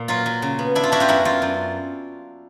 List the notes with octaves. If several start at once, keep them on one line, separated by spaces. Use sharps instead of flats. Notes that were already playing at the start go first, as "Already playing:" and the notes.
Already playing: A#2
F#3 F4
F#3
C#3
B3
D4 E4
F4
D4 E4 F#4
F4 G4
F#2 E4 F#4
F#2 F4
F#2